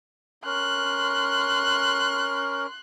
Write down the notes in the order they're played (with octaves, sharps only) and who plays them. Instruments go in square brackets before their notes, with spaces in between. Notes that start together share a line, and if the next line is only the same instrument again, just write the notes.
[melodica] C#4 A#4 [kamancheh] C6 F#6